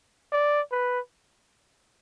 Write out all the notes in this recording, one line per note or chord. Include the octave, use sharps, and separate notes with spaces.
D5
B4